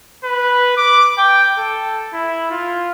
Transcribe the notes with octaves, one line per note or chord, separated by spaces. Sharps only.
B4
D6
G5
A4
E4
F4